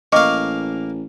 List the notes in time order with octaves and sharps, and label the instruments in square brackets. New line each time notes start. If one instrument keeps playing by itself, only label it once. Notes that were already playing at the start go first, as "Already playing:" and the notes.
[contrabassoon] A1 [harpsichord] A#3 F5 [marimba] D#5 [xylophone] C#6 D6